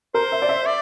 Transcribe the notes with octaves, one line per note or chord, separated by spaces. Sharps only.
A#4 C5
E5
D5
E5
D5